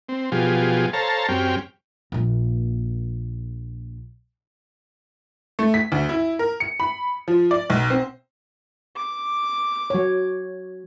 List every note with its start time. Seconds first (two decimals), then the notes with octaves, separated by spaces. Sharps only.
0.09 C4
0.32 B2 F3 F#3 F4 G4 G#4
0.93 A4 C5 C#5 F5 A5 A#5
1.28 F#2 C4 C#4 G4 G5 F6
2.12 A#1 A#3
5.59 A3
5.74 B6
5.92 D2
6.09 E4
6.39 A#4
6.60 C#7
6.80 B5
7.28 F3
7.51 D5
7.70 B1
7.90 C4
8.95 D6
9.90 F#3 C#5